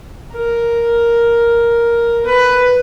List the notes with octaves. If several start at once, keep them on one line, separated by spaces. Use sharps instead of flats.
A#4
B4